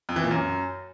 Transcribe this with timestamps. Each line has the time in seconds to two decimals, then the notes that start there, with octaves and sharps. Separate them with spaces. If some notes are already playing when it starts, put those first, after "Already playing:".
0.09 F2
0.16 E3
0.23 A#2
0.31 F#2